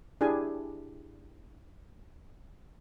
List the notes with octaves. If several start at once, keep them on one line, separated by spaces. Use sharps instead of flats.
D4 E4 G4 G#4 G#5